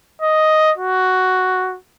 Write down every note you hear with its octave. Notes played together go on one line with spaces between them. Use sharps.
D#5
F#4